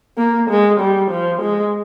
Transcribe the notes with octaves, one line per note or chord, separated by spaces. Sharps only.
A#3
G#3
G3
F3
G#3